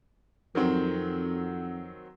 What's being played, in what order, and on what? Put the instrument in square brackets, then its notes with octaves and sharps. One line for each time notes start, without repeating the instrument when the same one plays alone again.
[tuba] F2 [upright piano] D#3 F#3 C4